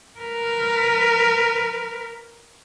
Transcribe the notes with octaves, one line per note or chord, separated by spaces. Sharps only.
A#4 B4